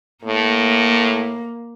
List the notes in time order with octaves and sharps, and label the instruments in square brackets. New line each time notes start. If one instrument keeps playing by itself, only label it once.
[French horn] A2 [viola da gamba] A#3